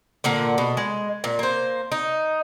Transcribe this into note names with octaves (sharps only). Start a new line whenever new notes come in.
A#2 D3 A#3 F#5
B2
G#3
A#2
A#3 C5
D#4